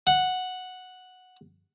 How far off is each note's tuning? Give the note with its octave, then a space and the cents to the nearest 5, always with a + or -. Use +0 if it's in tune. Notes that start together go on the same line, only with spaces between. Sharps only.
F#5 -5